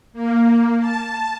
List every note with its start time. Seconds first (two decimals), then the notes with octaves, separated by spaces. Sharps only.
0.13 A#3
0.79 A5